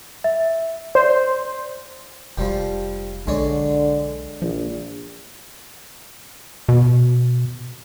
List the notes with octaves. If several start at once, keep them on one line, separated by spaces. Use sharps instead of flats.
E5
C5 D5
F1 F3 G3 G4
B1 D3 G#3 C#5 D5
A#1 F3
B2